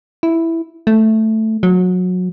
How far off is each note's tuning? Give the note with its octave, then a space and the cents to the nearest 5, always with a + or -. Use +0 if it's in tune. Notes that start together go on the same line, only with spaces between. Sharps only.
E4 +0
A3 +0
F#3 -25